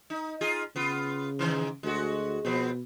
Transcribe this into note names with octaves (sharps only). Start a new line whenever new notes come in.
D#4
D#4 F4 G#4
C#3 B3 F4
G#2 D#3 E3
D2 G#3 F#4
B2 F3 B3 C4